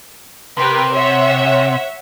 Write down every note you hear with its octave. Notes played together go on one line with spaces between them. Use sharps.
C3 G4 A#4 B4
C#5 E5 F#5